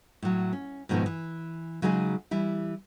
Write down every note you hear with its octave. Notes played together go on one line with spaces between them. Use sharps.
A2 F#3
C#4
G#2 B2 D#3 F3 A3 B3
E3
C#3 F#3 G#3 D#4 F#4 G#4
E3 G3 E4